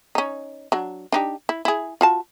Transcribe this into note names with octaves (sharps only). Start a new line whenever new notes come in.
C#4 D#4
F#3 D4
D4 D#4 G4
E4
E4 G#4
F4 F#4 A5